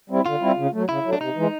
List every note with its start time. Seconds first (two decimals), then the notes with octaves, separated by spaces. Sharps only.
0.10 G3 C4 E4
0.26 D3 F4
0.42 G3 C4 E4
0.57 C#3
0.73 F#3 A3
0.89 C#3 E4
1.05 F#3 A3
1.13 D4
1.20 C3 D#4
1.36 E3 G#3